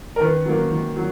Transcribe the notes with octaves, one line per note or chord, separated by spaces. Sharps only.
A#4
D#3 B4
F#3 A#3
D#3
F#3